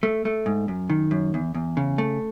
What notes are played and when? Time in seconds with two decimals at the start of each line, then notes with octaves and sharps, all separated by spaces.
0.03 A3
0.25 A3
0.46 G#2
0.68 F#2
0.90 D#3
1.11 F#2
1.34 E2
1.55 E2
1.77 C#3
1.98 A3